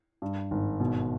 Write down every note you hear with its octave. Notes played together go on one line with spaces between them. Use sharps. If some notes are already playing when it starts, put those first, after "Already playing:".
G2
G#1
B2